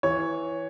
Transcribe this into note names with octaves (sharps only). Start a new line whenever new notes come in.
E3 C#5